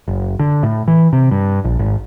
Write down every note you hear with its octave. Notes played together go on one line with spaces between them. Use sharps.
F#1
D3
A2
E3
C3
G2
A#1
G#1